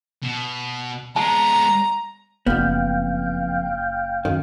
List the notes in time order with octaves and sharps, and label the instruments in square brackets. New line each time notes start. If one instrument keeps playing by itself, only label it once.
[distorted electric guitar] B2
[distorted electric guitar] G#3 B3 [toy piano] A5 [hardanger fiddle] A#5
[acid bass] F#1 [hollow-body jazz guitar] F2 B3 [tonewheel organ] F5 G5
[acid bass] F#2 [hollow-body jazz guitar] D#3